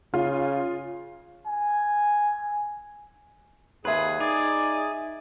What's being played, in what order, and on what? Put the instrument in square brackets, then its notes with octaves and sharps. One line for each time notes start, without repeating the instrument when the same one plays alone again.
[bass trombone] C#3 [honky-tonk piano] F4
[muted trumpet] G#5
[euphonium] D#2 [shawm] G#4 [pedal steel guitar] B4 [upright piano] E5 C6
[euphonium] D#4 [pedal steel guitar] G#4 [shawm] D5